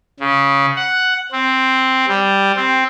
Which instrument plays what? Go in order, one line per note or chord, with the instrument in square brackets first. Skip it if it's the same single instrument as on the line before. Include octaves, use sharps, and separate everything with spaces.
[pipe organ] C#3
F#5
C4
G3
C4